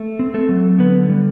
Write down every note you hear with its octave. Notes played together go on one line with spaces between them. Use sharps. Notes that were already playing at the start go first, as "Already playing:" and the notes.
Already playing: A3
C4
A3 A4
F#3
D3 B3 B4
G3